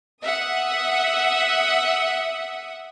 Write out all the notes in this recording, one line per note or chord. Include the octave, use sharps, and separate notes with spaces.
E5 F#5 D#6